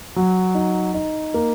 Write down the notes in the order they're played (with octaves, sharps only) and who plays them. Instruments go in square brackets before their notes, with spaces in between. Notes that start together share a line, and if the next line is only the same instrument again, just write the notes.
[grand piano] F#3
D#4
D#4
A#3